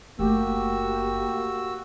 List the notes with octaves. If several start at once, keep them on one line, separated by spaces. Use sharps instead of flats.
F#1 A3 A#3 F#4 G4 E6